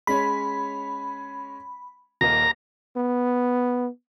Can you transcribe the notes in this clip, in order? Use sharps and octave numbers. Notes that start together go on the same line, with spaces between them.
G#3 C#4 C#5 B5
D#1 A#3 D#5 A#5
B3